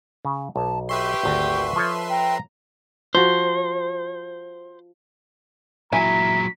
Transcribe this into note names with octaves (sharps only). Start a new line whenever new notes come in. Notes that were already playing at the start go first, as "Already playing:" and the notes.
C#3
B1 A5
G4 B4 E5 C6 C#6
G#1 D2
F3 A4 C#5
G5 A#5
F3 F#4 C5
A#2 F#3 E4 G#5 A#5 B6